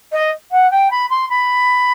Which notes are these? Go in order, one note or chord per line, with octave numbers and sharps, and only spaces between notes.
D#5
F#5
G5
B5
C6
B5